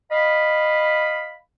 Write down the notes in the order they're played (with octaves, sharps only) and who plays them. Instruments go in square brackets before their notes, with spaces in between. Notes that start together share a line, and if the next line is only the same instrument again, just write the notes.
[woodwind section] D#5 F5 B5